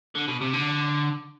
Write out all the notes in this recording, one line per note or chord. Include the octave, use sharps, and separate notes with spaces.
D3
B2
C3
D3